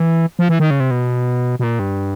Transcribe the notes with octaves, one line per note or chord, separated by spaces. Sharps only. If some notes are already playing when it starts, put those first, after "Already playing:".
Already playing: E3
F3
E3
D#3
C#3
C3
B2
B2
A#2
G2